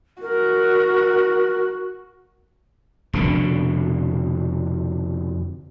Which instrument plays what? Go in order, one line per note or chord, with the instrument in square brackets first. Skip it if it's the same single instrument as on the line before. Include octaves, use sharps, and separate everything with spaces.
[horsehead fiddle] F#4 [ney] A#4
[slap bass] F1 B2 D3